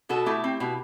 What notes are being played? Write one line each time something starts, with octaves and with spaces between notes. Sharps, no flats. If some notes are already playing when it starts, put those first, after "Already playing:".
B2 F#4 A4
A3 E4 G4
C4
B2